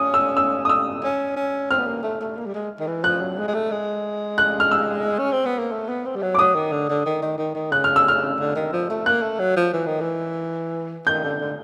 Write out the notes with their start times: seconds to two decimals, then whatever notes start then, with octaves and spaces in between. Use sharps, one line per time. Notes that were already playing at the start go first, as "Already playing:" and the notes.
Already playing: C#4 D#6
0.14 E6
0.37 E6
0.65 D#6
0.69 E6
1.03 C#4
1.37 C#4
1.71 C4 F6
1.79 B3
1.87 A#3
2.03 A3
2.21 A3
2.37 A#3
2.47 G3
2.54 G#3
2.80 D#3
2.87 E3
3.04 F3 F#6
3.21 F#3
3.38 G#3
3.48 G#3
3.54 A3
3.71 G#3
4.38 F#6
4.60 F6
4.71 E6
5.18 C#4
5.32 C4
5.46 B3
5.59 A#3
5.72 A3
5.89 B3
6.06 C4
6.16 G3
6.22 F#3
6.34 D6
6.39 F#3 D#6
6.55 D#3
6.72 D3
6.89 D3
7.06 D#3
7.22 D#3
7.38 D#3
7.55 D#3
7.72 C#3 F#6
7.84 F6
7.96 E6
8.08 F6
8.40 D3
8.55 D#3
8.73 F3
8.90 A3
9.06 A#3 F#6
9.22 A3
9.39 F#3
9.57 F3
9.73 E3
9.86 D#3
10.01 E3
11.07 D#3 G6
11.24 D3
11.40 D3